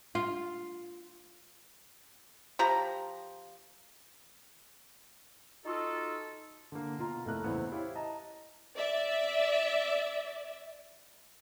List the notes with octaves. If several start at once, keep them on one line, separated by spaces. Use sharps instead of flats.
F4
F3 G4 A#5
D#4 F4 F#4 A4
D3 A#3
B2 F4 A#5
F1 A2 A3 A#3 A#4 F#6
E2 A2 C#3 B3 C4
E4 G4 C5 C#5 F5
D#5 A5 A#5
D5 E5